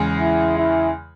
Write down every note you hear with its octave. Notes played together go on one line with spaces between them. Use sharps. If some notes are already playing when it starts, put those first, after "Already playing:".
Already playing: E2 C#3 G#3
E4
E4